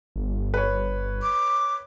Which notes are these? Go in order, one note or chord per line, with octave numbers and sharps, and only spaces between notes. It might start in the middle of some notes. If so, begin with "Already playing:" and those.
G1
B4 C#5
D6